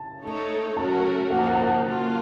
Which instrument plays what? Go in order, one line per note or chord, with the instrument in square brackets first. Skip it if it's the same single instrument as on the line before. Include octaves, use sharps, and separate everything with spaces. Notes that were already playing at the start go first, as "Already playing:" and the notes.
Already playing: [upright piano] A5
[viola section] A3 D#4 A4 C#5
[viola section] F#3 A3 C#4 F#4 A#4 [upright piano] A5
[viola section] F3 A#3 D#4 [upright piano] F#5
[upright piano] A5
F#5
A5
F#5
[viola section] F#3 A#3 F4